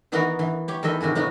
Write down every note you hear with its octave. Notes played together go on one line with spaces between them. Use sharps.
D#3 E3 B3 D#4 F#4 A#4
E3
G4 C#5
E2 D#3 A4 D#5 E5 C6
C3 D#3 F#4 G#4
A2 B3 D#4 F#4